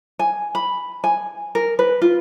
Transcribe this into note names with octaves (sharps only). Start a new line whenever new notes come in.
G#5
B5
G#5
A#4
B4
F4